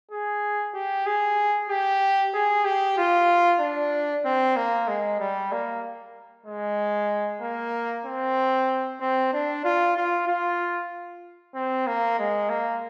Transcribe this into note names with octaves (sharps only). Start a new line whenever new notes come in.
G#4
G4
G#4
G4
G#4
G4
F4
D4
C4
A#3
G#3
G3
A#3
G#3
A#3
C4
C4
D4
F4
F4
F4
C4
A#3
G#3
A#3